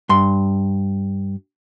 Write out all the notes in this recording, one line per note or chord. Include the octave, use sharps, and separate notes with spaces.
G2 C6